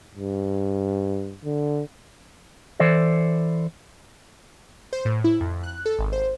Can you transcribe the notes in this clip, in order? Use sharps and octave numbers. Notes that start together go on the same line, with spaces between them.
G2
D3
E3 A4 C5 D5
C5
A2
E4
F2
F#6
A4
G#1
C5